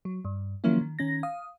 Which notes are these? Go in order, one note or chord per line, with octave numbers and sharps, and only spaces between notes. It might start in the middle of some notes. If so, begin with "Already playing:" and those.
F#3
G2
D#3 F3 F#3 A#3 C#4 E4
D#3
D#3 C#4 A#6
F5 D#6